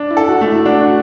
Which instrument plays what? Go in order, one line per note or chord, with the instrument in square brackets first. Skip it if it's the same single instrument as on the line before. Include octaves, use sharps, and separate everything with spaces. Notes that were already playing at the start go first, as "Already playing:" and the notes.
Already playing: [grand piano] D4
[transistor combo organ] E4
[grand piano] A4
[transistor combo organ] F#4
[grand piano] A3
[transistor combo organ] E4
[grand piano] D4 [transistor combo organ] F#4